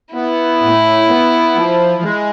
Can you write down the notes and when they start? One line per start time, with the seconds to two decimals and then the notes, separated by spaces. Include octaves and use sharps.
0.15 B3 E4
0.62 A2
1.09 B3
1.55 F3
2.03 G#3